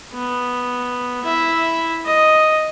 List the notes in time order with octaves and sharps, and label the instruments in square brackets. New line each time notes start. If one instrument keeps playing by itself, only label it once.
[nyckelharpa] B3
E4 E5
D#5